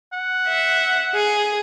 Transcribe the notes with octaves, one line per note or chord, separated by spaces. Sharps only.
F#5
E5
G#4